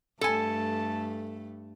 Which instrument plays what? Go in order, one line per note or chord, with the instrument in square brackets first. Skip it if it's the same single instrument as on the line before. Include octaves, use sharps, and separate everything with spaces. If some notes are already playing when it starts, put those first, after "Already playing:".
[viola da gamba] G2 A3 [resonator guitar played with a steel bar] A4 G#5 [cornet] A5